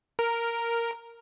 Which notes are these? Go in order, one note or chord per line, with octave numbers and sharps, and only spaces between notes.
A#4